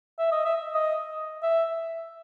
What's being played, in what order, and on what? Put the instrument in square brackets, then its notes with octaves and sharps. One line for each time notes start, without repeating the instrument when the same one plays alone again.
[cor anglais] E5
D#5
E5
D#5
E5